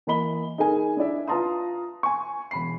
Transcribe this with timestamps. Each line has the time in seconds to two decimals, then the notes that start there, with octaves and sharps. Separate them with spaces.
0.07 E3 A#3 D#5 B5 G7
0.58 D#4 G#4 A#4 G#5
0.97 D4 E4 D5 E5
1.28 F4 B4 A5 A#5 C6 D#6
2.03 G#5 C6 C#6
2.51 E1 B5 C7